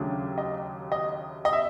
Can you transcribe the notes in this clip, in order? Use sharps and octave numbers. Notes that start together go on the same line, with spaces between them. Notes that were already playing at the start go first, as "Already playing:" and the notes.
Already playing: D#2 C#3 F#3 A3 D4
D#5
D#5
D#5
E5